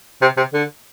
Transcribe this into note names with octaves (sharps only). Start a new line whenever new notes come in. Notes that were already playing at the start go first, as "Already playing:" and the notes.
C3
C3
D3